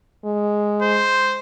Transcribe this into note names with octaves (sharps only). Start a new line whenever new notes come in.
G#3
C5